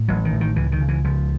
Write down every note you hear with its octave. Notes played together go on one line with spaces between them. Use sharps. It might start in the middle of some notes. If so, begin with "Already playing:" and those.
Already playing: A2
A1 F#3
D#3
A2
D#3
C#2 E3
D#3
C#3
E3
C#2 F3